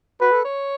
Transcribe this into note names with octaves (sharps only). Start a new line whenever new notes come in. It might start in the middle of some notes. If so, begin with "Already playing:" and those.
F#4 B4
A4
C#5